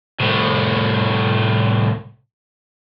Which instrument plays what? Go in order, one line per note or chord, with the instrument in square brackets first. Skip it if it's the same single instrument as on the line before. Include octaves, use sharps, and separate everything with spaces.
[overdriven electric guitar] C2 A2